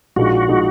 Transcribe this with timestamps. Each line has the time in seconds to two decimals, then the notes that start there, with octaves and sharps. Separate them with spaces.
0.16 A#1 A#2 G#3 D#4 F#4
0.48 A#2 G#3 D#4